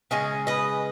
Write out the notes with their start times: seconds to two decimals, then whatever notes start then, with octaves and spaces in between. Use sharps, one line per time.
0.11 C#3 G#3 C#4
0.47 B4 D#5